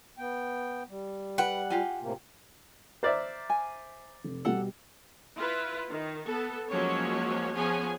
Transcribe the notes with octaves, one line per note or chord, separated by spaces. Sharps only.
B3 G5
G3
B4 F#5 G5
F4 G4 G#5
A2 C3 A#3
C5 D5 E5 A#5 F6 A6
G#5
F1
B2 G3 A4 F#5
E4 F4 B4
D#3
B3 A4
F3 F#3 G#3 A#3 C#4 C#5
F3 B3 C#4 G#4 C#5 G#5